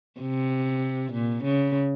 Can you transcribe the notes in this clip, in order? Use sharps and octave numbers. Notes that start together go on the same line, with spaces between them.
C3
A#2
C#3